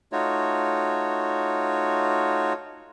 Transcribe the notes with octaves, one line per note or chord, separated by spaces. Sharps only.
A3 D#4 F4 F#4 C#5